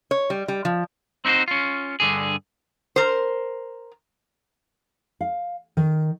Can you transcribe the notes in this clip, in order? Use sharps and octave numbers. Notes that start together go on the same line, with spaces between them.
C#5
G3
G3
F3
C4 D#4 E4 F#4 C5
C#4 F4
G2 D3 G#4
A#4 C5
F5
D#3